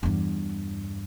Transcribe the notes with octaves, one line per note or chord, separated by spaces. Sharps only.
E2 G2